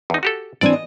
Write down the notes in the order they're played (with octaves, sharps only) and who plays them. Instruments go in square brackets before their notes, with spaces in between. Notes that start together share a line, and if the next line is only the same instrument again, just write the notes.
[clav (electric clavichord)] E2 D#4
F#4 G4 A4
[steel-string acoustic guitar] E3 C4 D4 [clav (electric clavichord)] D5 G#5
[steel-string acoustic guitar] D#5